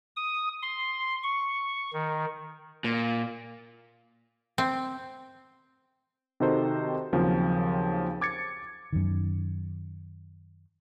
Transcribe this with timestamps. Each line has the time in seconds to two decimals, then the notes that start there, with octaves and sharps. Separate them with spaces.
0.16 D#6
0.62 C6
1.23 C#6
1.93 D#3
2.84 A#2
4.58 C4
6.40 C3 D#3 D#4 F#4 A4 C5
7.13 D#2 C#3 F3 F#3 C4
8.21 D6 G#6 A6 C#7
8.93 F#2 D#3